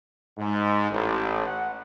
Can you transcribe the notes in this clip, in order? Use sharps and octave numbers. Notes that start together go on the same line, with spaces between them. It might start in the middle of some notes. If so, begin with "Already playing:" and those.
G#2
A1
F#5